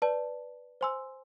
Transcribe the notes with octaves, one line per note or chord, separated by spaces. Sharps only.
B4 D5 A5
C5 G#5 C6 E6